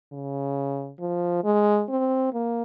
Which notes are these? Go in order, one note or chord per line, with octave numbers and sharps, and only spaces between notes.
C#3
F3
G#3
C4
A#3